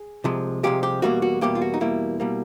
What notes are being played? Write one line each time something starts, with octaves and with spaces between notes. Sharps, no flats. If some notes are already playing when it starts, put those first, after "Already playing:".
Already playing: G#4
C2 C3 F3 G#3
C2 C3 F3 G#3 G4
G4
E2 B2 G3 A#3 F#4
F#4
E2 B2 G3 A#3 G4
F4
F#4
D#4
E2 B2 G3 A#3 E4
B2 G3 A#3